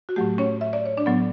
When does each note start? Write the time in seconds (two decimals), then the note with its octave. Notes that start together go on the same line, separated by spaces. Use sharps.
0.09 F#4
0.16 A2 F#3 A3 G4
0.38 C#4 C#5
0.61 E5
0.73 D5
0.86 C#5
0.97 D4 D5
1.06 A2 F#3 B3